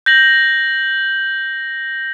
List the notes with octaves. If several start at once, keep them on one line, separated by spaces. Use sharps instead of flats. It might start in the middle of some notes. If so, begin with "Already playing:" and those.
G6 A#6 F#7